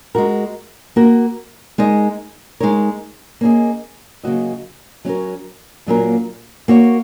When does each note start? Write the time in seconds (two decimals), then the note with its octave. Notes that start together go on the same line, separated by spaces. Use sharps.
0.15 G#3 F#4 A#4
0.96 A#3 F#4 A#4
1.78 G#3 D#4 A#4 D#5
2.60 G#3 D#4 A#4 C#5
3.41 A#3 C#4 G#4 D#5
4.23 C#3 F#3 A#3 F#4 D#5
5.05 F#3 C#4 F#4 A#4
5.87 A#2 F#3 A#3 C#4 A#4
6.68 A#3 F#4 C#5